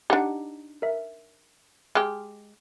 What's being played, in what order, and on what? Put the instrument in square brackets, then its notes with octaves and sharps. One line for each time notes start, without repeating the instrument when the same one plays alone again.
[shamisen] D4 D#4 [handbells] G4 F#5
[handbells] A#4 E5
[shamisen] G#3 G4 [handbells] F6